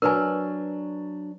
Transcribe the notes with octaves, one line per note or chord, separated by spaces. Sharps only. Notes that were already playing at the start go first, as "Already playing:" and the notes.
F#3 D4 A#4 B4 G#5